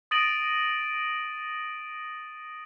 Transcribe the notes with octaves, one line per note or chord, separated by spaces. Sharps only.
D#6 A6 A#6 D7 D#7 F#7